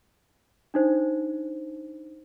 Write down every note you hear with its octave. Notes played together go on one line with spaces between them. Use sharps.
D4 D#4 C5